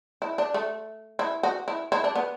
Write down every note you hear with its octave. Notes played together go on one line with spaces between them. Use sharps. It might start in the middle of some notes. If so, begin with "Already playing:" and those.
E4
D4
A3
E4
F#4
E4
E4
D4
B3